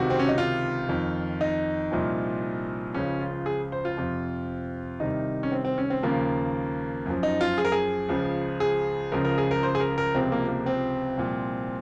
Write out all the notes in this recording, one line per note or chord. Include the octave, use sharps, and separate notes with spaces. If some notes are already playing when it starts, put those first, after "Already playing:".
Already playing: C#2 C3 D#3 F#4
C4
C#4
D#4
F4
F2 D#3
D#4
C2 A#2 F3
C#2 C#3 F3 C#4
F4
G#4
C5
F4
F2 C3 F3
C2 C3 D#3 D#4
C#4
C4
C4
C#4
C4
D#2 C#3 F3 A#3
F#2 F3
D#4
F4
G#4
A#4
G#4
C#2 C#3 F3
G#4
C#2 C#3 F3 A#4
A#4
G#4
A#4
C5
G#4
A#4
A#4
C#2 C3 F3 C4
A#3
A#3
C4
C2 A#2 F3